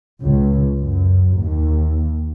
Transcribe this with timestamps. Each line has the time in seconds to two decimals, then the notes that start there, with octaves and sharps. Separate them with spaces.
0.21 C#2
0.80 F#2
1.36 D#2